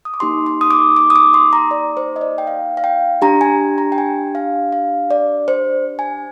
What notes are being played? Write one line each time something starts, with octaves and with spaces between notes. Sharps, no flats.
D#6
D6
A#3 D#4 G4 C6
C6
D#6
D6
D6
D#6
D6
C6
A#5
D5
C5
D#5
D5
G5
F5
F5
G5
D4 G4 A#5
G#5
A#5
G5
G#5
F5
F5
D5
C5
G#5